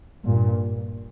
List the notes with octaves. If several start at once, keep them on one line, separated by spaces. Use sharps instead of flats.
G2 A#2